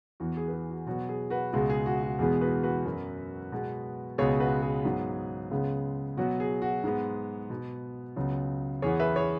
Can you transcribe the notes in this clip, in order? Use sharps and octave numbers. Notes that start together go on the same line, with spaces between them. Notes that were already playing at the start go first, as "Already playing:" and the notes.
E2 E3 B3 F#4
G#4
B4
G#4
F#4
B2 F#3 B3 F#4
G#4
F#4 B4
C#2 B2 G#3 F#4
G#4
F#4
F#4
E2 B2 G#3 B3 G#4
F#4 B4
F#4 B4
F#2 F#3 B3
B2 G#3 B3
C#2 B2 G#3 B3 G#4 C#5
F#4 B4
G#4
G#2 F#3 B3
C#2 C#3 G#3 B3
B2 F#3 B3 F#4
G#4
F#4
G#2 G#3 B3
B2 B3
C#2 C#3 F#3 B3
E2 E3 B3 G#4 C#5
B4 E5
G#4 C#5